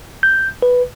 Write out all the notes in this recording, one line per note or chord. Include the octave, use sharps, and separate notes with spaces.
G6
B4